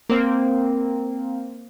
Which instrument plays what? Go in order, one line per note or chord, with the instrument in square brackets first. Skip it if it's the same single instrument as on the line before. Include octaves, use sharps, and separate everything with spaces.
[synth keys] A#3 C4